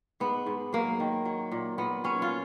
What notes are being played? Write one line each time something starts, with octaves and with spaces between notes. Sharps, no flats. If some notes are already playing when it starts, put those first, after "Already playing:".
G#2 B3
G#2
F#3 A#3
D#3
F#3
A#2
A#2 B3
F#3 C#4
F4